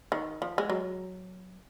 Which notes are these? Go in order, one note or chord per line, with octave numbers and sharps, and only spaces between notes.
D#3
F3
G#3
F#3